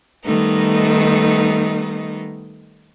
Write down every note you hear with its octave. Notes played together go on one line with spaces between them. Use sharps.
D#3 G3 A3 B3 D#4